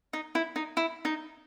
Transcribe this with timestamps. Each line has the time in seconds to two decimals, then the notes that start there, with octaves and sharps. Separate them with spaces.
0.13 D#4
0.35 E4
0.56 D#4
0.77 E4
1.05 D#4